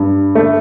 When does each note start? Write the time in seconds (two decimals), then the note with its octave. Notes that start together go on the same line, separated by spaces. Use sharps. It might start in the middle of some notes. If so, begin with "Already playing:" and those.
Already playing: G2
0.35 A3